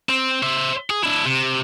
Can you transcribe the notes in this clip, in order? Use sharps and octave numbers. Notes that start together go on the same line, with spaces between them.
C4
C5 E5
G#4
D4 E4
C3